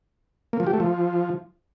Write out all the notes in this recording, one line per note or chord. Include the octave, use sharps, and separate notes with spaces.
A#3
F3
G4
A3
F3